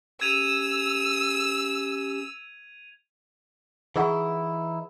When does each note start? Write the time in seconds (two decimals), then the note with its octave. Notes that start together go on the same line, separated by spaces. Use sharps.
0.21 C#4 G4 E6 G#6 D#7 F7
3.96 E3 D#4 E4 G#4 F#5 C#6